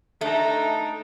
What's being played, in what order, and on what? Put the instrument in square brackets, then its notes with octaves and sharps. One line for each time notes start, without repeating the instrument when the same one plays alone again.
[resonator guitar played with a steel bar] A3 [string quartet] D4 D#4 A4